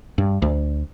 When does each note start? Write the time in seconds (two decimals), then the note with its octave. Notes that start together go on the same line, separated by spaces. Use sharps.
0.18 G2
0.42 D2